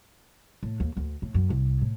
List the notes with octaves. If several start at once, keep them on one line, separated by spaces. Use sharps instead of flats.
A2
D#2
D2
A2
F#2
C2
A2